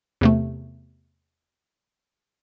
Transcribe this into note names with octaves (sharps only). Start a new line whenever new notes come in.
E2 C3 A3